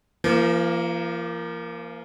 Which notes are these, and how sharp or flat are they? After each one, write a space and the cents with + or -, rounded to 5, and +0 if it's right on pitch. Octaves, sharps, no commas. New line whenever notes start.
F3 -40 A#3 +0